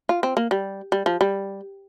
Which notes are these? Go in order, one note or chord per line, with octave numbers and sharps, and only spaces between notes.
F4
C4
A#3
G3
G3
F3
G3